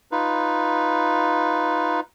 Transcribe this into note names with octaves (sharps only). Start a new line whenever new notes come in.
D#4 F4 B4